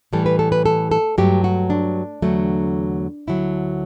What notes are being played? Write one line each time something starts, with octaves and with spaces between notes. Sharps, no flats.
A2 E3 G3 A4
B4
A4
B4
A4
A4
G2 F#3 A3 G4
F#4
D4
E2 D3 F#3 A3
D2 D3 F#3 E4